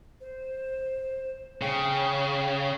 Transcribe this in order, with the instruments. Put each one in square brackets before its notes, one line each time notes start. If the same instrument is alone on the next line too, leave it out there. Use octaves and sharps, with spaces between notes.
[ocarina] C5
[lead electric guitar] C#3 [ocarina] G5